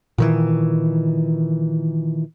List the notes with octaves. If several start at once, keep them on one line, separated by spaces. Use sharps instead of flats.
A#2 D#3 E3